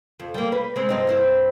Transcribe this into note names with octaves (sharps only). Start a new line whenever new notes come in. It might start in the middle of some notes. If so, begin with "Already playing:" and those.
F2
G3 A#3
B4
G#3 C4
G2 C4 D#4
G2 C4 E4